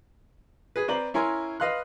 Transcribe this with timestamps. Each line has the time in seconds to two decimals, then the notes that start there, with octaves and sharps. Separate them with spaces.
0.76 G#4 B4
0.88 C4 B4 C5 D5 A#5 F#7
1.14 C#4 E4 A#4 G#5 C6
1.60 B4 D#5 F5 C6 F#6